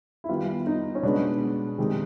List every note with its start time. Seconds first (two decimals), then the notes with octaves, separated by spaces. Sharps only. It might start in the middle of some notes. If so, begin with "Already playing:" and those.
0.24 E4
0.29 D#3 G3 B3 F4
0.67 D#4
0.95 C#4
1.03 B2 G#3 B3 D4
1.78 C3 D#3 G#3